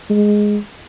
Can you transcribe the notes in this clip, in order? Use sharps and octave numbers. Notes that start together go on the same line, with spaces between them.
G#3